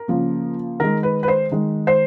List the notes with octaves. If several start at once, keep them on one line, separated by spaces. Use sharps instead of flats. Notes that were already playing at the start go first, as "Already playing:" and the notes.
Already playing: A#4
C#3 F3 A#3
D#3 G#3 A#4
B4
B4
C5
D#3 G#3
C5